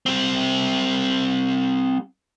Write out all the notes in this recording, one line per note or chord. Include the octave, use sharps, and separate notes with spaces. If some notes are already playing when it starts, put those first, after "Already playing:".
G3 C4